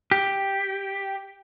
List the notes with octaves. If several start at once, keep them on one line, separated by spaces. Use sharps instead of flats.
G4